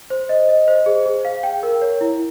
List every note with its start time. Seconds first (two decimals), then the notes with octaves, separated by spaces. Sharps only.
0.10 C5
0.29 D#5
0.49 D#5
0.68 C5
0.86 G#4
1.06 G#4
1.25 F5
1.43 G5
1.63 A#4
1.82 C#5
2.01 E4